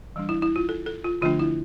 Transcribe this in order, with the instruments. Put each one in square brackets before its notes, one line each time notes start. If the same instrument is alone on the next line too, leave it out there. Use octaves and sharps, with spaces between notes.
[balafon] E3 G3 D4
E4
E4
F4
A4
A4
F4
D3 F3 A3 D4 F4
E4